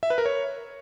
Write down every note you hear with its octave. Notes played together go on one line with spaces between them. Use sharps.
E5
B4
A#4
C#5